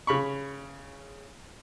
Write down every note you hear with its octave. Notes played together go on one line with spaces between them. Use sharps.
C#3 B5 C#6